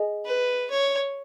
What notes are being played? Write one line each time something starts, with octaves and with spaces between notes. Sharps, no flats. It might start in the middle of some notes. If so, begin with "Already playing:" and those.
Already playing: G#4 D#5 G#5
B4
C#5